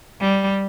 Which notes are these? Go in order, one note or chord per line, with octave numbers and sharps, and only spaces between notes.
G3